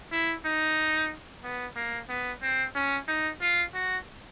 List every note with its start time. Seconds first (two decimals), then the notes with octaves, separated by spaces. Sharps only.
0.12 E4
0.45 D#4
1.43 B3
1.76 A#3
2.09 B3
2.42 C4
2.75 C#4
3.08 D#4
3.41 F4
3.74 F#4